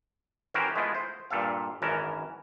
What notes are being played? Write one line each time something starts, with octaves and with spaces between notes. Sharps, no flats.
E3 C#4 F#4 G4 A#4 C5
G#3 A3 B3 E4 F4
C5
G2 A#2 A4 E5 F5
G#1 F#2 E3 C#4 A#4 A5